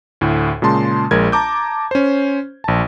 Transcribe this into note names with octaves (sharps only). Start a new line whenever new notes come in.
D2 A2
A#2 C#3 G#3 A5 C6
A#1 G#3 A#4 G#6
A5 A#5 D6 G6
C#4 C5
A#1 A5